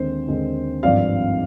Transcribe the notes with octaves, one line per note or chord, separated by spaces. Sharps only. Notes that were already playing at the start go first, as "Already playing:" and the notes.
Already playing: D#2 D3 G#3 C4 C5
D#2 D3 G#3 C4
G#1 G2 F3 C4 D5 F5